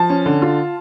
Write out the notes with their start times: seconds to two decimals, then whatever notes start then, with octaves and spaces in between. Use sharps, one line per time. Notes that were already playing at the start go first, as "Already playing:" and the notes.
Already playing: F3 A5
0.10 C#4
0.26 D3
0.42 F4